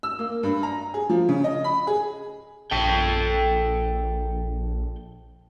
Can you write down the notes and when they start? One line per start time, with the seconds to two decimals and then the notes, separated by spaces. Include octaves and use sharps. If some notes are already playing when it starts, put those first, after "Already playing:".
0.03 E6
0.19 A#3
0.43 G2
0.63 A#5
0.94 G#4
1.09 F3
1.29 C#3
1.44 D#5
1.64 B5
1.87 G#4
2.72 A#1 A4 G5